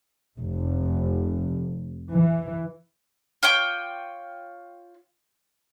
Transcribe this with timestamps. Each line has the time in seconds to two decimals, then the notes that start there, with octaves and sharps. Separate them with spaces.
0.38 F1
2.12 E3
3.43 F4 C#5 G5 D6